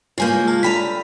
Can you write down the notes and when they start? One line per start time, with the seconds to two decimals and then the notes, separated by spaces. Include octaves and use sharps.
0.18 C#3 G#3 A#3 F4 G#5 G6
0.48 A5 F6
0.63 D3 G#5 A#5 B5 B6